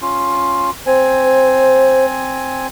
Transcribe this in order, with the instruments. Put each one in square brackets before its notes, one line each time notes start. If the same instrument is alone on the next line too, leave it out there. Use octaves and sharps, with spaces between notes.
[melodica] C#4 F4
[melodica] C4 G#5 [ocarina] C5